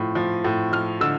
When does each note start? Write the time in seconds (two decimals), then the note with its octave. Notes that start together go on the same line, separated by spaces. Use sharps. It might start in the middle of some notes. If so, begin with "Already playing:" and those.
Already playing: A2 F3
0.15 F3
0.44 A2
0.72 F3 F6
1.01 D3 E6